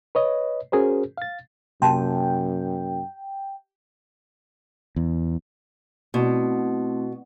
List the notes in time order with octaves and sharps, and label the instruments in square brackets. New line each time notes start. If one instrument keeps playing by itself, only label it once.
[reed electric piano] B4 C#5 D#5
C#4 F#4 G#4 A#4 C5
F5 A6
[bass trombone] F#2 [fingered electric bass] C3 A#3 [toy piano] G4 A5 C6 [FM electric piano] G5
[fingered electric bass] E2
[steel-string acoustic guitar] B2 [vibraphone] A3 C4 E4